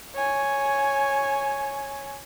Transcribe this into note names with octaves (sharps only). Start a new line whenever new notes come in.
C#5 G#5